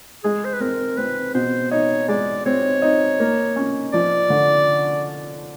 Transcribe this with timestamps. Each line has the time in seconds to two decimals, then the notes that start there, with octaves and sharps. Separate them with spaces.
0.24 G#3 G#4
0.45 C5
0.53 B4
0.60 C4 A#4
0.97 C4 B4
1.34 B2 C5
1.71 D#4 C#5
2.08 G#3 D5
2.46 C4 C#5
2.82 D#4
3.20 A#3
3.56 C#4
3.93 F3 D5
4.30 D3